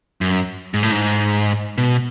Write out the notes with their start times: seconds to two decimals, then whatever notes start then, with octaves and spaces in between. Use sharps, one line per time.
0.21 F#2
0.74 G#2
0.83 A2
0.91 G#2
1.78 B2